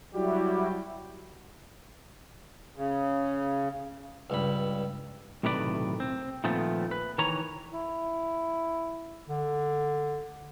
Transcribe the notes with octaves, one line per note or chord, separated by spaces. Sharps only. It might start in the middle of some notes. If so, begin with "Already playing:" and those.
F#3 G3 E4 F#4 G4
C#3
C#2 G2 B5
B1 A2 C3 D#3 B4 D5
C4
A#2 D#3 F3 A3 B3 C4
B4
D#3 E3 B4 C#5 A#5
E4
D3